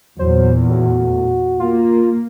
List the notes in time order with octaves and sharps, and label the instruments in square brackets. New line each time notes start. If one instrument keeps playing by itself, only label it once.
[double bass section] E2 A#2 [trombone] F#3 [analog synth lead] C5
[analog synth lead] A2 [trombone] F#4
[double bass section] A#3 [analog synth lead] F4